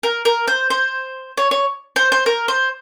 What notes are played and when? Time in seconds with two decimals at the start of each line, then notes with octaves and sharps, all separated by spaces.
0.03 A#4
0.25 A#4
0.47 C5
0.70 C5
1.37 C#5
1.51 C#5
1.96 C5
2.12 C5
2.26 A#4
2.48 C5